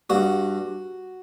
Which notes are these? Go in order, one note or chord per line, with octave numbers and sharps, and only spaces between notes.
G2 F#4